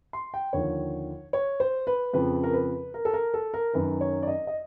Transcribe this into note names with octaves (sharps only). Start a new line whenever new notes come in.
C6
G5
D#2 D3 F3 C#5
C#5
C5
B4
F2 C#3 F3 B4
A#4
B4
A#4
A4
A#4
A4
A#4
F#2 D#3 B4
C#5
D5
D#5
D#5